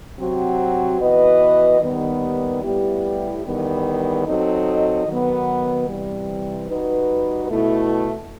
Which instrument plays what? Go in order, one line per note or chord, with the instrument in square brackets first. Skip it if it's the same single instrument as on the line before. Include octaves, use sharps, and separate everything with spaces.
[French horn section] C3 F#3 C4 F#4
E3 B3 F#4 B4 D#5
D#2 D#3 G3 B3
A2 G3 B3 E4 G4
E2 D#3 G3 B3
F#3 C4 D#4 A4 D#5
D#3 F#3 B3
C3 E3 G3
G3 D#4 F#4 B4
B2 A3 E4